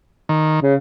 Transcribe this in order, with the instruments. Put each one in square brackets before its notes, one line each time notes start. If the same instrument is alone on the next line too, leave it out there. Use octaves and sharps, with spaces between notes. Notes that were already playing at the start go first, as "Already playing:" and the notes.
[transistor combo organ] D#3
[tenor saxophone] C#3